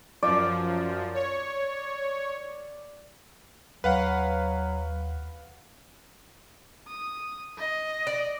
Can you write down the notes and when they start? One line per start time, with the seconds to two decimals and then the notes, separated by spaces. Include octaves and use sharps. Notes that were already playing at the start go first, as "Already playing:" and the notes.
0.23 F#2 F3 D5
1.15 C#5
3.84 D#2 F#3 B4 F5 F#5
6.88 D#6
7.58 D#5
8.07 D5